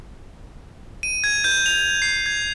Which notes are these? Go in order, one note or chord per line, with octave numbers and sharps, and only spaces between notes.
D#7
G#6
G6
F7
C7
G#6